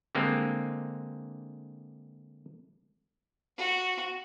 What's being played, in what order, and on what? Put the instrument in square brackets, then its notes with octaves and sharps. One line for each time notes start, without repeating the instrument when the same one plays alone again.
[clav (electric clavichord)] D3 G3 G#3 A#3 C4
[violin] F#4